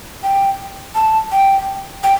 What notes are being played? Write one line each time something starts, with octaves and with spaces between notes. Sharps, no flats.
G5
A5
G5
G5